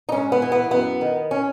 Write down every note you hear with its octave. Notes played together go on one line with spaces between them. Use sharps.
D#4
G#2 C#4
B3
E3
B3
F#2 B3
D#3
C#4